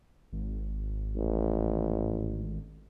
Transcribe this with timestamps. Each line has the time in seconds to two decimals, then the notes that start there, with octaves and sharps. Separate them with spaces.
0.32 G#1
1.16 A1